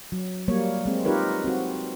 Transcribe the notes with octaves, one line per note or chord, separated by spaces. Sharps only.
F#3
F#3 G3 A#3 C#5
G#3 C4
D#4 F4 G4 A#4 B4 C#5
C4 F#4